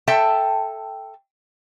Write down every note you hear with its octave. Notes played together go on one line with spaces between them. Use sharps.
A4 E5 G5 A5